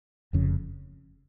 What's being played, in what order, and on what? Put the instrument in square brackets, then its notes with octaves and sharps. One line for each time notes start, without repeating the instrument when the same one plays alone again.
[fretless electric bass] F1 F2 C#3